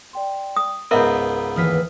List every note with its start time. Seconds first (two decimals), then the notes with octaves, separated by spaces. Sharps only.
0.13 D5 G5 C6
0.56 D#6
0.91 C#2 G#2 B3 A#4 E5 A#5 B5 G6
1.56 D#2 E3 B4 D#6 F6 B6